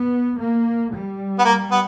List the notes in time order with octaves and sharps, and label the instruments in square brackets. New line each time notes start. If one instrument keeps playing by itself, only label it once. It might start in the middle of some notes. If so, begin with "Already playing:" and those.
Already playing: [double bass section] B3
A#3
G3
[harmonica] B3
A#3
B3